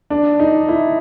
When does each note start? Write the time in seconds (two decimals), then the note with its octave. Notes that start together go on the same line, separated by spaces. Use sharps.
0.10 D4
0.40 D#4
0.68 E4